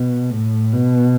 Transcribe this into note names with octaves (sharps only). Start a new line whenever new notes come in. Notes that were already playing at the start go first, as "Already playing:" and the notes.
Already playing: B2
A2
B2